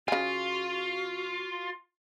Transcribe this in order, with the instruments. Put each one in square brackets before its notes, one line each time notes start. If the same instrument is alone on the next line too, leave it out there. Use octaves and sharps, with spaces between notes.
[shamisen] C#3 G#5 [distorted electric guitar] F4 [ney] F#4